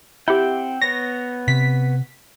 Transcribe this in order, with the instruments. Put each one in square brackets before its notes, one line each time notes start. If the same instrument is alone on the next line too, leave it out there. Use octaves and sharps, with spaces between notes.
[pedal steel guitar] C4 F#5 G5 [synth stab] E4 G4
[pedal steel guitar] B3 C#5 [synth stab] A#6
[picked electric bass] C3 [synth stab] B6